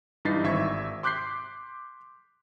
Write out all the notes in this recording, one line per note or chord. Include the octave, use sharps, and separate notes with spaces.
G2 E3 D#4 A6 B6 C7
G#1 E5 C#6 G#6
C6 D6 F#6 G6 B6 C7